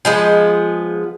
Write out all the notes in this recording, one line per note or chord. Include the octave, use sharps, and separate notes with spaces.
F3 G#3 B3